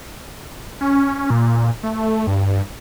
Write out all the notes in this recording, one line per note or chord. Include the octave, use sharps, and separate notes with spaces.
C#4
A#2
A3
G2